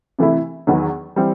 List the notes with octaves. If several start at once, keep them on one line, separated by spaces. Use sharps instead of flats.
C3 E3 A3 E4
E2 D#3 F#3 B3
E3 G3 C4